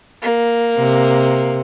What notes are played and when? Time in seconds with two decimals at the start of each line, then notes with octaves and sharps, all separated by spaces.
0.22 A#3
0.79 C3